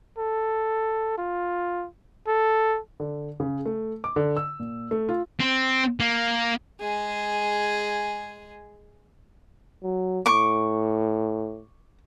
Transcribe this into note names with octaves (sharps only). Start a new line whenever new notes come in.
A4
F4
A4
D3
C#3
A3
D6
D3
E6
A#2
A3
F4
C4
A#3
G#3 G#4
F#3
A2 C#6 D6